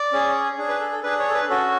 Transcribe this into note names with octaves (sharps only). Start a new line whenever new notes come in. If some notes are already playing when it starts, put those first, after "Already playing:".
Already playing: D5
C#4 G#4
D4 G#4
B4
A4
A4
D4 G#4 B4
C#5
A4
B4
C#4 F#4 A4